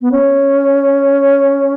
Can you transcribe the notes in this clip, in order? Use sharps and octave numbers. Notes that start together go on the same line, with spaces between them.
B3
C#4